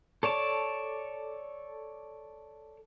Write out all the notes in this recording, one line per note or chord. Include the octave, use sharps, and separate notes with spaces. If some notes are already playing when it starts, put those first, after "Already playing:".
A4 C#5 D5 A5